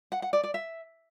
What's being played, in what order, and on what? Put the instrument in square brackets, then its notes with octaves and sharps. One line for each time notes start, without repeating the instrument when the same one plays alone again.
[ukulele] F#5
F#5
D5
D5
E5